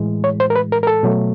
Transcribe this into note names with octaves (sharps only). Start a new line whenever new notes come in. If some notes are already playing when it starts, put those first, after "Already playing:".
Already playing: A2 E3 G#3
C#5
C5
A#4
B4
A#4
A#4
A4
B2 F#3 A3